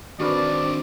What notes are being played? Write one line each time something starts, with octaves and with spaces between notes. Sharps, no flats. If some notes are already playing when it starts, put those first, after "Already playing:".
D#3 C4 D4 F#4 A#4 B4 D5